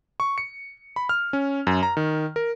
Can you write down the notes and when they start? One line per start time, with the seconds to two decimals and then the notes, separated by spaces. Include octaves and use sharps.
0.20 C#6
0.38 C#7
0.96 B5
1.09 F6
1.33 C#4
1.67 F#2
1.83 A#5
1.97 D#3
2.36 A#4